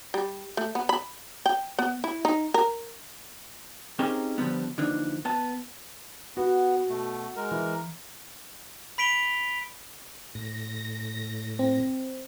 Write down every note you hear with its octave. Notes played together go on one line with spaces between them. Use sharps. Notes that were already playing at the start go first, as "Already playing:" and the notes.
G3
A3
B3
B5
G5
B3
E4
D#4
A#4
C4 C#4 D#4 G4 G#4 A#4
D3 F3 G3 B3
D3 E3 F3 A#3 D4 D#4
B3 A5
B3 F#4
B2 A3
G#3 A#4
E3
B5 B6 D7 F7 G7
A2 A#6
C4